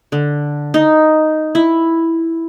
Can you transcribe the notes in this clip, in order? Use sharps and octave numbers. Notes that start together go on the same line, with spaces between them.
D3
D#4
E4